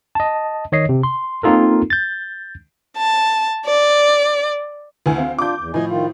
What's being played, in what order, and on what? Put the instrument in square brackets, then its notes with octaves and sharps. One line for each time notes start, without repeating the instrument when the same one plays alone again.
[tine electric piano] D#5 A5
D#3 C#5 D#5 C7
C3
C6
A#3 C4 D#4 F4 A4 A#4
G6 A6
[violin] A5
D5
[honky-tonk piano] D2 E3 G#5
[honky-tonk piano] C4 [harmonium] F5
[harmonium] D4 F4 [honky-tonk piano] D6 G6
[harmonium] E2
[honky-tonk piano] A2 F3 [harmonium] D#5 G#5
[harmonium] D#3 F4